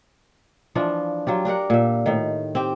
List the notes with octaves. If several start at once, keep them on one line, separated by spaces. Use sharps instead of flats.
E3 F3 D4 F4
F#3 F4 G4
D4 G4 A#4 F#5
A#2 E5
A2 D#3
C4 G4